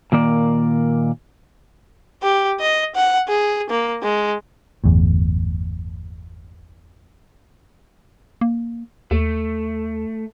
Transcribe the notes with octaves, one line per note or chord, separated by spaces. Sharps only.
A#2 D#3 A#3 D5
G4
D#5
F#5
G#4
A#3
G#3
G1 E2 A2
A#3
D#2 A3